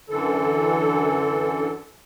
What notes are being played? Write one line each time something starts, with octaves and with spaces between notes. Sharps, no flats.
F#2 D3 E3 A4